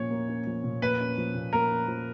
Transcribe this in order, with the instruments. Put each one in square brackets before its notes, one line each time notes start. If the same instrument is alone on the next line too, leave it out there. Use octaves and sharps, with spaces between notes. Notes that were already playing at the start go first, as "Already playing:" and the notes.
Already playing: [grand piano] A#2 F3 A#3 C#4 [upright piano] C#5
[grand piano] A#3
C#4
F3
A#2
[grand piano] A#3 [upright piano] B4
[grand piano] C#4
F3
A#2
[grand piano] A#3 [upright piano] A#4
[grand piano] C#4
F3